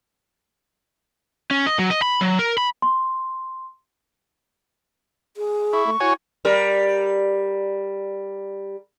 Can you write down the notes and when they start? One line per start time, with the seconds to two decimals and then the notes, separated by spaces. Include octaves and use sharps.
1.51 C#4
1.67 D#5
1.79 F#3
1.91 D#5
2.02 B5
2.21 F#3
2.39 A#4
2.58 B5
2.82 C6
5.37 G#4
5.73 E4 C#6
5.87 A3
6.00 E4 F#4 C#5 G#5
6.45 G3 A#4